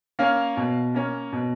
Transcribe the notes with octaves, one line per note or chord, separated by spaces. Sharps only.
A#3 C#4 F5
B2
A#3 C#4
B2